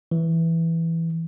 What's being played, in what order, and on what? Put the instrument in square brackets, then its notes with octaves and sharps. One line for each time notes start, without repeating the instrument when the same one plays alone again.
[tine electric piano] E3